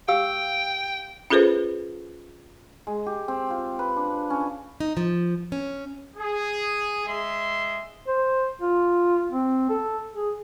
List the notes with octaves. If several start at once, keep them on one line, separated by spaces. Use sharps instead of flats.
G4 F5 G5 E6
C#4 F4 G#4 A4 B4 C5
G#3
G4
C4
F4
B4
D4
C#4
D#4
F3
C#4
G#4
G#3 E5 C6
C5
F4
C4
A4
G#4